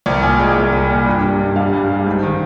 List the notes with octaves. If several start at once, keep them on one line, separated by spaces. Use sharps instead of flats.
C2 G5
A#2 G#5
G#3 G5
C2
C2
A#2
G2
G3
G2
G3 F5
G2
G3
G#2
D#3